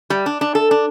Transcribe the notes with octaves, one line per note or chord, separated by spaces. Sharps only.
G3
D4
D4
A4
D4